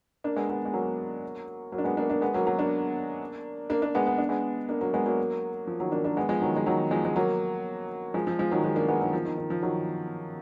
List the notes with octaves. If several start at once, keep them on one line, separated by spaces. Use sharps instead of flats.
A#3 D4
G#3 B3
G#3 B3
G#3
F#3 A#3
F#3 A#3
D4
G#3 B3
A#3 D4
A#3 D4
G#3 B3
F#3 A#3
F#3 A#3
A#3 D4
A#3 D4
A#3 D4
G#3 B3
B3
D4
G#3 B3
A#3 D4
F#3 A#3
G#3 B3
F#3 A#3
F3
D#3 F#3
A#3 D4
A#3 D4
G#3 B3
F3 G#3
D#3 F#3
G#3
D#3 F#3
F3 G#3
G#3
F#3 A#3
F3 G#3
F3
F3 G#3
D#3 F#3
F3 G#3
A#3 D4
G#3 B3
D#3 F#3
F3
D#3
D#3
F3
D#3 F#3